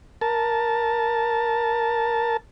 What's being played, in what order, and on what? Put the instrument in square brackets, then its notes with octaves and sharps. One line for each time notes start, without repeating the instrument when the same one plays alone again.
[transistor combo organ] A#4 A5